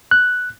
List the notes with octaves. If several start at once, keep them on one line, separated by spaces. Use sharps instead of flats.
F#6